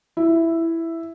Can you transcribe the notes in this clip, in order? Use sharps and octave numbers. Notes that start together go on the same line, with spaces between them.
E4